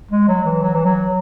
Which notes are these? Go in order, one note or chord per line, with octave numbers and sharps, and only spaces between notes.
G#3
F#3
E3
F#3
E3
F#3